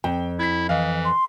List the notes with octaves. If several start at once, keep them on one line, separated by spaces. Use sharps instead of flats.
F2 G5
E4 G#6 B6
E3 D#5 F5
C6